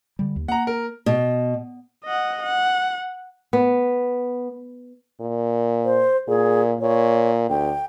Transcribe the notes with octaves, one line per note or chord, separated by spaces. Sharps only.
D3 G3
D#2
A#3 F#5 A#5
A#4
B2
D#5 F#5
F#5
B3
A#2
C5
A#2 G#4
A#2 C#5
D2 G5